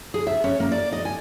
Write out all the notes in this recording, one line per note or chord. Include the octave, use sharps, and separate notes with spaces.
G#4
E5
C#4
A#3
D5
D#5
G#5